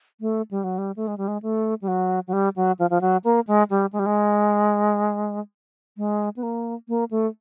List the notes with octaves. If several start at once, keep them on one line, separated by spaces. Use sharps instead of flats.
A3
G3
F#3
G3
A3
G#3
G3
G#3
A3
G3
F#3
F#3
G3
F#3
F3
F3
F#3
A#3
G#3
G3
G#3
G3
G#3
G#3
B3
A#3
A#3
A3